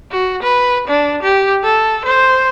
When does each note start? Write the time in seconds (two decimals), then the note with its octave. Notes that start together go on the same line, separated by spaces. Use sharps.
0.12 F#4
0.43 B4
0.88 D4
1.23 G4
1.64 A4
2.05 C5